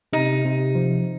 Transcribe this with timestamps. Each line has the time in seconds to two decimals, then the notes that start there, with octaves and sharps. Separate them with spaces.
0.13 C3 D#4
0.44 C3
0.75 F3